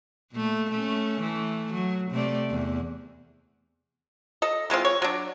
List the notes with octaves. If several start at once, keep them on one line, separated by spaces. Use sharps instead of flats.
A#2 A3
A3 C#4
E3 A3
F#3
C3 A3 D5
E2
A4 D#5
E3 G#3 C4 F4
C#5
F#3 D4